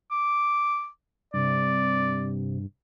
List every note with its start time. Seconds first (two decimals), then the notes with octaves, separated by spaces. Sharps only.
0.11 D6
1.34 G2 C3 D5